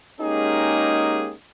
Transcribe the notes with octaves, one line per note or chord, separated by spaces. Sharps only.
G#3 A#3 C#4 D#4 G4 G#4